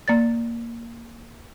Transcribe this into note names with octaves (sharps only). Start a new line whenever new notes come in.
A#3 D5 A6